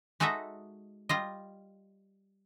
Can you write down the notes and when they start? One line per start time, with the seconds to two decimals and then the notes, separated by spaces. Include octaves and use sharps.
0.20 G#3 D#4 F#4 A4 D#5 E5
1.09 G3 F4 D#5